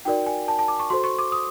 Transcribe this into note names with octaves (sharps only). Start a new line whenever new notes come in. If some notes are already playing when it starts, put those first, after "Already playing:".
D#4 F#4 A#4 D5 G5
G#5
A5
A5
D6
C#6
F#4 A4 C5 C6
C#6
D6
D#6